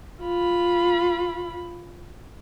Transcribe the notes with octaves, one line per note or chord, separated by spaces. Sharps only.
F4 B5